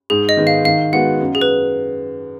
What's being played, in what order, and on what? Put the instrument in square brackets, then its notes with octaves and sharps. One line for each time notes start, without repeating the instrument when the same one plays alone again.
[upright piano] G#2 [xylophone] G#4
[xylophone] D#5
[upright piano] D#3 G#3 B3
[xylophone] F5
[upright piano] D#3 [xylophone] F5
[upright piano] G#3 B3 F#4 [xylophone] F#5
[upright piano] F#2
[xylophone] G#4
B4